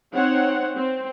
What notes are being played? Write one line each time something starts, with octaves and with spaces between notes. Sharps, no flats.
C4 D#4 C#5 F#5
C4